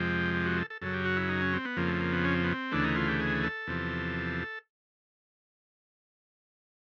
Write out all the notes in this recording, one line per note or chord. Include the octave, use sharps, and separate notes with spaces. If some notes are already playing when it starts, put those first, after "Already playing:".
Already playing: F2 C3 F3 G#3 G4
G4
F#4
A4
A4
F#2 C#3 F#3 A4
G4
F#4
E4
D#4
C#4
C4
B3
F2 C#3 F3 A#3
A3
A#3
B3
C#4
C4
B3
C4
D2 C#3 E3 A3 D4
D#4
F4
G4
G#4
A4
E2 C3 F3